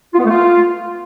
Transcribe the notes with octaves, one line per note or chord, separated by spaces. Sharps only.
F4
B3
A3
F4